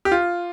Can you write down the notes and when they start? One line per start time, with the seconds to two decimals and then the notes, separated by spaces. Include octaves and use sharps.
0.05 G4
0.12 F4